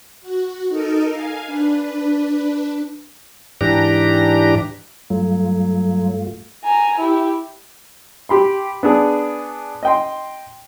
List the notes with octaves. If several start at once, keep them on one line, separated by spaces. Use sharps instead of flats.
F#4
D#4 A4 A#4 D#5
F5 G#5
D4 B4
G#2 E3 D4 G4 A#5
G2 F#3 A3 F4
G#5 A#5
E4 G4
G4 B5 C6
B3 D4 G#4
D#5 G5 C6